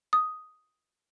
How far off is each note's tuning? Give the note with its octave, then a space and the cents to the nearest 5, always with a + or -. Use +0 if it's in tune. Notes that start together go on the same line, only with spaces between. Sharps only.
D#6 +5